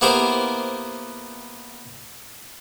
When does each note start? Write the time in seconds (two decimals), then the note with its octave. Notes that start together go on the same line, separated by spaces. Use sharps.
0.01 A#3 B3 E4 G4 A#4 C5